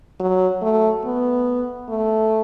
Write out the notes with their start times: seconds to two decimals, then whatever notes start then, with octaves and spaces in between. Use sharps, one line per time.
0.20 F#3
0.62 A3
1.05 B3
1.89 A3